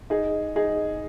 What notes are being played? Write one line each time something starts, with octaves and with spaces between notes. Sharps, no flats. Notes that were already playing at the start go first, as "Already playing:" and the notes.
D#4 G#4
D#4 G#4